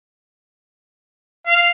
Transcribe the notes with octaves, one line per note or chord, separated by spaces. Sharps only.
F5